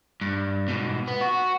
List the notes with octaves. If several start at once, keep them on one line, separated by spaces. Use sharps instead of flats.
G2
G#2 B2
B3
F#4